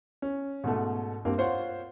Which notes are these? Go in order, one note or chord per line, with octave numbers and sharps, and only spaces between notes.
C#4
G#2 B2 A3
G2 A#3 C4 G4
F4 C5 C#5 F#5